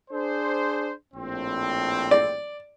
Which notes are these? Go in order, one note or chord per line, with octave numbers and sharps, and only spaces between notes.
D4 G#4 C5
A#1 A2 C4
D5